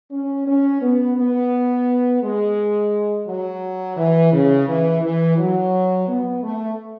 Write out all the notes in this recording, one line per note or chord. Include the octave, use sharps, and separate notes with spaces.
C#4
C#4
B3
B3
G#3
F#3
E3
C#3
E3
E3
F#3
B3
A3